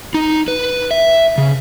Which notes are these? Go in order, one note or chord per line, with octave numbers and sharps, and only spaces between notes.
D#4
B4
E5
C#3